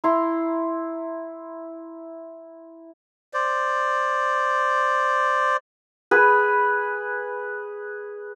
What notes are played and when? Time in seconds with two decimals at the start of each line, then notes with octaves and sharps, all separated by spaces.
0.04 E4 A#5 C6
3.34 C5 D5
6.11 G#4 B4